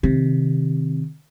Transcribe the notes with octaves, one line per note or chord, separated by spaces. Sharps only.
C3 D#3